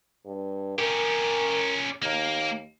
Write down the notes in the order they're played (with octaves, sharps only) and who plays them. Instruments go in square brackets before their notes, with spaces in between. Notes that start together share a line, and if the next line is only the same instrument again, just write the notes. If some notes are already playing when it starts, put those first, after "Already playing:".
[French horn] G2
[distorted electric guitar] C#4 G4 [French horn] A#4
[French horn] D#2 [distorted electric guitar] A#3 A#4